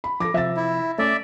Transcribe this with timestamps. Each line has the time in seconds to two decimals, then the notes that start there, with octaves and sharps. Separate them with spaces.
0.04 B5
0.20 F3 A4 D6 A#6
0.34 C3 F3 E5 E6 A6
0.57 E4
0.98 A3 C#4 D5 E5 D6